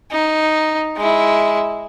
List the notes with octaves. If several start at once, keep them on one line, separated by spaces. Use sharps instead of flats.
D#4
G#3 E4